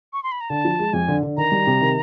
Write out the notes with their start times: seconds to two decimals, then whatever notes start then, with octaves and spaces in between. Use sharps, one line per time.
0.13 C#6
0.23 C6
0.32 B5
0.41 A#5
0.50 D3 A5
0.65 F3
0.79 G#3
0.93 F2 G#5
1.08 D3
1.23 D3
1.37 D#3 A#5
1.52 G3
1.67 C3
1.81 D#3